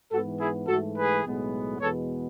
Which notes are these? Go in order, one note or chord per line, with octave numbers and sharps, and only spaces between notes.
G#2 E3 B3 F#4 A4
E4 G#4
G#2 E3 A3 F#4 A4
G#4 B4
B1 A2 G#3 B3
E2 B2 G#3 B3 A4 C#5